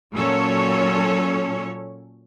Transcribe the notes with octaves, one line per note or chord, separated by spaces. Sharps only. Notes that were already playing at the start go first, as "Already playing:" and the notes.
A#2 F#3 C#4 A4 C#5